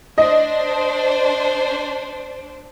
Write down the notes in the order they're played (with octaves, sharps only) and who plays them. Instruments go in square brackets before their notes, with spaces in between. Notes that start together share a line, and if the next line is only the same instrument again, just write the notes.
[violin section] D4 C5 [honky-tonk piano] D#5